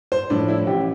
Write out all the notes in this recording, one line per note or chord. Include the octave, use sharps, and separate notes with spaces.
C5
A2 F3 D4
E4
A1 G4